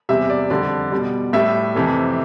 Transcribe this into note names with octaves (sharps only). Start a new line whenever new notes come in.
E2 C3 G3 E5
D5
F2 D3 G3 D5
B2 G3
A2 G3 E5
F2 C3 E3 A3